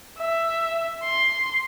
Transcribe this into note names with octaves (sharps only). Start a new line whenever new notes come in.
E5
C6